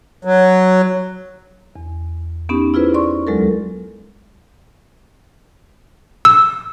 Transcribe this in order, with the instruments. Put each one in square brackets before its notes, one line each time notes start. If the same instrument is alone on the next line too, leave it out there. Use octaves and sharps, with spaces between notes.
[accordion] F#3
[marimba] E2
B3 C#4 D#4 G4
E4 F4 G#4 B4 C5
D5 C6 C#6
D2 F#3 G#3 A4 A#4
[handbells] E6